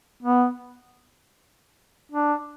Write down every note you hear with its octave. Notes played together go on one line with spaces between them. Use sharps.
B3
D4